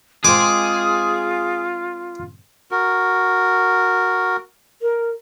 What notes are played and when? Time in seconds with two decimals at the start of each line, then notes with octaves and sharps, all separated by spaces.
0.25 G#3 C4 F4 G#4 D6
2.71 F#4 A#4
4.82 A#4